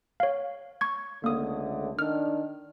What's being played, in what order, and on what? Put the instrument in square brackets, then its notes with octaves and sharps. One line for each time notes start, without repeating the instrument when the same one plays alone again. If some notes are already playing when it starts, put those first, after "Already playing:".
[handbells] C#5 F5
C#6 G#6
[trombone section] C#2 D3 A3 [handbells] A#3 D#6
[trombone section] D#3 D4 [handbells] F6